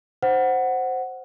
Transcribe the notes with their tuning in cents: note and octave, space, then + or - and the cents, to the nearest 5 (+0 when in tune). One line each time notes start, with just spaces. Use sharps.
C5 +0 F#5 +5